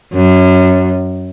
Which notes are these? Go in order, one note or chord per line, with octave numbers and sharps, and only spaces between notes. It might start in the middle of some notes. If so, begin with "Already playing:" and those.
F#2